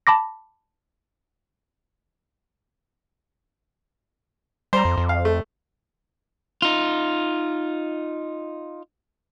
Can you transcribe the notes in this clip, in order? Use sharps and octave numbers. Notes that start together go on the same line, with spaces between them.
A5 B5 D6 A#6
G3 C5 A#5
F2
F2
F5
A3
D#4 F4